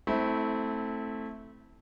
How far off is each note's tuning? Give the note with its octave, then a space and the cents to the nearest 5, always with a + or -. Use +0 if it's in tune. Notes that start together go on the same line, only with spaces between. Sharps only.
A3 +0 C4 +0 E4 -25